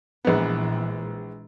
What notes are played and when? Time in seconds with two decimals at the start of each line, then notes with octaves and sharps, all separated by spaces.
0.25 A#1 A#2 E3 G#3 B3